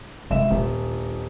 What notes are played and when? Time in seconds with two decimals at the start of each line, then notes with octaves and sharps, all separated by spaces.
0.30 G#1 C3 D4 E5 E7
0.50 D#1 D4 F4